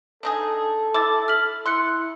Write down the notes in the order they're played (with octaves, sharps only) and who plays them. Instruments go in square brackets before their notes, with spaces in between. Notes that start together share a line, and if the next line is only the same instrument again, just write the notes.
[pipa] D4 D#4 G#4 [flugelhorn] A4
[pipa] E4 [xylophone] D6 A6
[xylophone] F6 B6 F#7
[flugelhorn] E4 [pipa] C6 [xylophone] E6 F#6 C#7